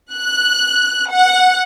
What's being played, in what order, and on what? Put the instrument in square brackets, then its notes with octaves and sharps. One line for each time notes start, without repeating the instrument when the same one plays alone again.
[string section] F#6
F#5